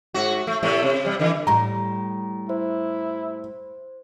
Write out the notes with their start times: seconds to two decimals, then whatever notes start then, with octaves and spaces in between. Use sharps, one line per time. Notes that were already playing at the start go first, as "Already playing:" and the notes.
0.14 G#2 F#4
0.47 A3
0.63 A2 C3 A3
0.83 C3
1.05 C3 G3
1.19 D3 E3
1.47 A2 G3 A#5
2.49 E4 C5